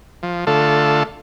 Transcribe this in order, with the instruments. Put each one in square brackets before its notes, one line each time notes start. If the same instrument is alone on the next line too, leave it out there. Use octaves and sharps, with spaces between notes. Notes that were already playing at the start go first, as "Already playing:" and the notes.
[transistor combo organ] F3
D3 A3 F4 A4